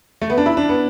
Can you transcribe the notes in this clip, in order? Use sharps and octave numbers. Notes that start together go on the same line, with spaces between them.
A3
B3
D4
E4
D4
B3